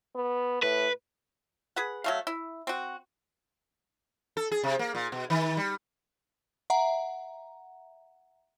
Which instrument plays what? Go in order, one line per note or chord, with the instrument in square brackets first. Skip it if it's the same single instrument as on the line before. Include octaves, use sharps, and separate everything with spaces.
[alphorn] B3
[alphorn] A2 [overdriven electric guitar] B4
[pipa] G#4 B4 F#5
F#3 A3 F5
E4
C4 F#4
[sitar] A4
G#4
C3
A#3
A#2
B2
D#3
G3
[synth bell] E5 F#5 A#5